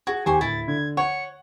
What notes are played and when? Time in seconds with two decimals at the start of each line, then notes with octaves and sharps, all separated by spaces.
0.07 F#4 G#4 G#6
0.26 D#2 G4 C5 G#5 C#6
0.41 D1 E4 A6
0.68 D3 G#6
0.97 C#5 F#5 C#7